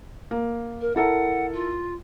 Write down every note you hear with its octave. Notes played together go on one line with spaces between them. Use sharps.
A#3
A#4
E4 A4 A#4 F#5
F4